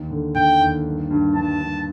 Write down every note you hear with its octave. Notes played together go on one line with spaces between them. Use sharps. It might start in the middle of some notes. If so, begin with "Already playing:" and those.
Already playing: D#2
D3
D3 G5
D#2
G2
G2
G2 A5
G2